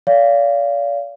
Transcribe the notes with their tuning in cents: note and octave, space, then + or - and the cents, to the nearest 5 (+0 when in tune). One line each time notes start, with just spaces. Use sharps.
D5 -45 F5 -10